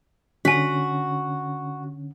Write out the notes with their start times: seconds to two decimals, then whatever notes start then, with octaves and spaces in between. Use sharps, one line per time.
0.45 D3 C#4 F#4 G#5 B6